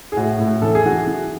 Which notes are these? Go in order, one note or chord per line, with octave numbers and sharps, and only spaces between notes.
G#4
A2 F#4
A2
E3 A4
G#4
E3 F#4
G#4
E3